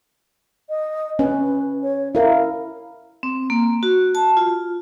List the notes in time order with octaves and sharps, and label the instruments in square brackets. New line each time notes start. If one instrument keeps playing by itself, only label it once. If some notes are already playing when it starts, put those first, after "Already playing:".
[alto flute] D#5
[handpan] C#4 [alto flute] B4
[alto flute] C#5
[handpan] E4 A#4 [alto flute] F5
[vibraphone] C4
A#3
F#4
A5
F4